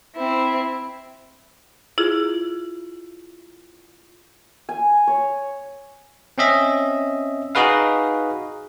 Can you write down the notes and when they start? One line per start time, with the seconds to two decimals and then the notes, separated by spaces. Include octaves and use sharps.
0.16 C4 E4
1.98 E4 F4 G#4
4.69 G#5
5.07 C#5
6.38 C4 C#4 D#5 E5
7.55 D#4 F#4 G#4 B4 F5